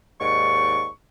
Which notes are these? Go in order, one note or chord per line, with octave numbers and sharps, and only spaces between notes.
D#2 G#2 D5 C#6